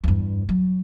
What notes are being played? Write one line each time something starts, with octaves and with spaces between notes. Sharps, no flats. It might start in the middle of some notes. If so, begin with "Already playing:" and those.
E2 G2
F#3